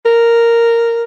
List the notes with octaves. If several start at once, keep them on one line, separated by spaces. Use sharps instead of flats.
A#4